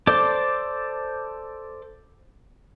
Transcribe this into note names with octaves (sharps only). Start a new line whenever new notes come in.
A4 C5 D5 D6